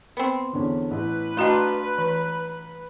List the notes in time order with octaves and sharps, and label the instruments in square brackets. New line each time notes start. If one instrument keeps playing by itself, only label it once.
[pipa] B3 C4
[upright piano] E2 D3 C#4
[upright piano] A1 [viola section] B4
[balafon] A3 F#4 D#5 [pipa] D4 F4 [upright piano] G5 A#5 C6
[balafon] E3